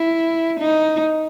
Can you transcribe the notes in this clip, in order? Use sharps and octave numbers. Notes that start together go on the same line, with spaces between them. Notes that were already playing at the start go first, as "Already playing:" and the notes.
Already playing: E4
D#4